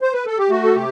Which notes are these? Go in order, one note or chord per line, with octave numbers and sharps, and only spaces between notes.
C5
B4
A4
G4
A3 F#4
A4
C3 G4